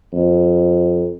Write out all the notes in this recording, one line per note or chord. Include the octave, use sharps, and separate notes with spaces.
F2